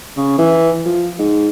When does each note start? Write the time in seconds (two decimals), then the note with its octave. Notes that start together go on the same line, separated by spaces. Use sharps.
0.17 C#3
0.39 E3
0.86 F3
1.19 G#2